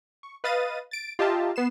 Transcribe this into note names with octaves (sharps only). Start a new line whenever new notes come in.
C#6
B4 D#5 F5 D#6 A6 D#7
A6 D7
F4 G4 D#5 E5 A5 A#5
B3 C7 E7